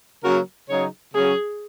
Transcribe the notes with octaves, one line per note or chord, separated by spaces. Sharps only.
C#3 F#3 A#3 F#4 A#4
C#3 F#3 D#4 G#4 C#5
C#3 F#3 C#4 G#4